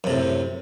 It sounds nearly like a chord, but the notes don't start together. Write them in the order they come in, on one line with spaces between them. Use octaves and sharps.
F#2 C3 A2